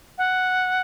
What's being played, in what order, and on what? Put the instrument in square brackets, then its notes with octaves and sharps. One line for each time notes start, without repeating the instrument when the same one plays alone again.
[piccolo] F#5